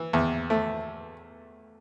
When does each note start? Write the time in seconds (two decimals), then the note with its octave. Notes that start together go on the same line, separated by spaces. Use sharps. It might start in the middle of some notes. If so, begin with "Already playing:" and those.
Already playing: E3
0.13 E2
0.50 A3